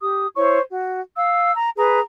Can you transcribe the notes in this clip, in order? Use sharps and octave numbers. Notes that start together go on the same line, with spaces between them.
G4 D#6
E4 C5 C#5 C#6
F#4
F5 E6
A#5
G#4 B4 A#5